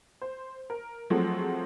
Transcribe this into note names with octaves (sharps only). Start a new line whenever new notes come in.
C5
A#4
F3 F#3 G#3 A3 C4